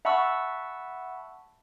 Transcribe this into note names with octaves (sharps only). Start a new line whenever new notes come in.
E5 F#5 A5 B5 C#6 E6